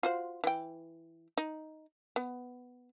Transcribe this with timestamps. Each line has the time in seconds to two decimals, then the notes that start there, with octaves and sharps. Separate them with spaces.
0.03 F4 F#4 C5
0.44 E3 G5
1.38 D#4
2.16 B3